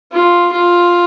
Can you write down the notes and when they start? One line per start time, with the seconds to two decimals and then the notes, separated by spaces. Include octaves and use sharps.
0.12 F4
0.52 F4